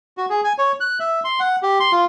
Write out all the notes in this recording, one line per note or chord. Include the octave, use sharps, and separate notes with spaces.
F#4
G#4
G#5
C#5
F#6
E5
C6
F#5
G4
C6
F4